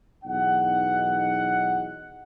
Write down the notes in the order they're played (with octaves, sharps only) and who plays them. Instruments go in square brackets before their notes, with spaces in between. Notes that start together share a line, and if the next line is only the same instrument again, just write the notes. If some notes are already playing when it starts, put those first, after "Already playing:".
[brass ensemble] B1 E2 D#4 F#5